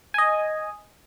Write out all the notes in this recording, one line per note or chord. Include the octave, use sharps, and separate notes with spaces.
D#5 G#5